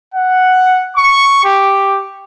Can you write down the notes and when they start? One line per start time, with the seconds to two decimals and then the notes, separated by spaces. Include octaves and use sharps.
0.14 F#5
0.96 C#6
1.45 G4